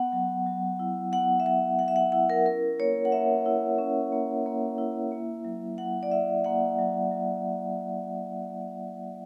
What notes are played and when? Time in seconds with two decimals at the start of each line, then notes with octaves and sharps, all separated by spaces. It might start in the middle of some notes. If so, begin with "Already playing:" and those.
Already playing: B3 F#5
0.12 F#3
0.46 F#3
0.79 E4
1.12 B3 F#5
1.40 E5
1.46 F#3 F#5
1.79 F#3 F#5
1.88 E5
1.96 F#5
2.12 E4 F#5
2.30 A#4
2.46 C#4 A#4
2.79 A#3 C#5
3.05 F#5
3.12 A#3 E5
3.46 E4
3.78 C#4
4.12 A#3
4.46 A#3
4.78 E4
5.12 A#3
5.45 F#3
5.78 F#3 F#5
6.03 D5
6.11 E4 E5
6.45 A#3 F#5
6.79 F#3
7.11 F#3